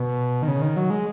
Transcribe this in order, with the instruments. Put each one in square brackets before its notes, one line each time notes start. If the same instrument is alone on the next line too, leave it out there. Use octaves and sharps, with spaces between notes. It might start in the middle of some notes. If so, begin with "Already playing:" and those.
Already playing: [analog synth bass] B2
D#3
C#3
D#3
F#3
G#3